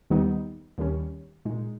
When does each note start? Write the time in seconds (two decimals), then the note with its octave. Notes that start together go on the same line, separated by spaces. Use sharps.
0.10 D#2 D#3 G3 B3 D#4
0.78 D#2 D#3 G3 C#4
1.45 A#2 G#3 D#4